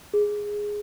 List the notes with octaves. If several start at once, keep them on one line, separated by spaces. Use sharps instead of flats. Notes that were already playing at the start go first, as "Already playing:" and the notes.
G#4